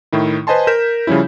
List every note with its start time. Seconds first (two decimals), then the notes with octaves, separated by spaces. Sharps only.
0.12 A2 D#3 E4
0.47 B4 C5 D#5 G#5 A5 C6
0.67 A#4 G6 B6 E7
1.07 C#3 F3 G3 C#4 E4